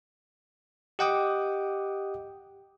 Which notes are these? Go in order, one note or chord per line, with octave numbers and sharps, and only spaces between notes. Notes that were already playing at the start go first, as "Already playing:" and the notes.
G4 D#5 F#5 G5 D6 D#6